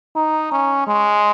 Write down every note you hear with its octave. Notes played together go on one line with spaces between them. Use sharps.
D#4
C#4
G#3